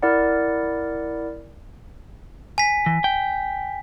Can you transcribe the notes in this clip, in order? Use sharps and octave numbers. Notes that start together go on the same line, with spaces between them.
E4 A#4 D5 F#5
G#5 B6
E3
G5